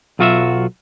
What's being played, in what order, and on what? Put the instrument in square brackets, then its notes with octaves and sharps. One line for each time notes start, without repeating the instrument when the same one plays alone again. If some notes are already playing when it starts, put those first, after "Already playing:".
[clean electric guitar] B1 F#3 F4 F#4 D#5 E5